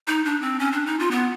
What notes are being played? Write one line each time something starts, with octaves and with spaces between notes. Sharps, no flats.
D#4
D4
C4
C#4
D4
D#4
F4
B3